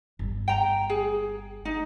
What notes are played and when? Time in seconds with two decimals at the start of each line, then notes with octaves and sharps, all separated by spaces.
0.19 G1
0.48 G5 A#5
0.90 G#4
1.65 D#4